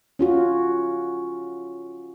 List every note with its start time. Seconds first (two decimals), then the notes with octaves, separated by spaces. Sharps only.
0.19 C#4 F4 F#4